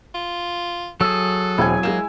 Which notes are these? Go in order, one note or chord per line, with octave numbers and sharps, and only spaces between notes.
F4
F#3 G#4 A4 E6
E1 C4 E4 G#5
G#3 A#3 G#6 E7